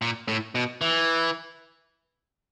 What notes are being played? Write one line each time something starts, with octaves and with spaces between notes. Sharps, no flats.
A#2
A2
B2
E3